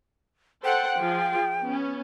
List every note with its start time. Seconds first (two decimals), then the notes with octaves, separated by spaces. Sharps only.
0.64 A4 C5 F#5 G5
0.98 F3 F4 G#4
1.60 B3 C#4